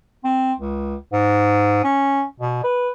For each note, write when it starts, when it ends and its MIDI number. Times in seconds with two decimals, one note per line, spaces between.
0.24 0.53 60
0.60 0.96 37
1.13 1.80 44
1.84 2.23 61
2.40 2.61 47
2.64 2.90 71